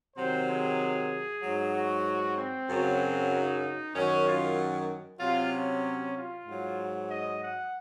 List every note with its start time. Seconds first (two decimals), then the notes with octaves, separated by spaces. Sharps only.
0.16 C3 D#3 F#3 C5
0.48 G#4
1.43 G#2 F#3
1.74 F#4
2.37 C4
2.68 F#2 C#3 F#3
3.31 D#4
3.94 F#2 D#3 F#3 C#4
4.26 F4
5.20 C3 F#3 F4
5.51 C#4
6.14 F4
6.46 G#2 F#3
7.09 D#5
7.41 F#5